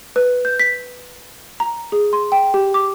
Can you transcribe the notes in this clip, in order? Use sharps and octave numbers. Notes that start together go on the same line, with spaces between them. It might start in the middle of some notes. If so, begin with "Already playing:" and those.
B4
G6
B6
A#5
G#4
C6
G5
G4
D6